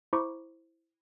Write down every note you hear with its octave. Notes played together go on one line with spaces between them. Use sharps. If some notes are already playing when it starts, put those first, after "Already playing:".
E4 C5 A#5 B5 C#6 D6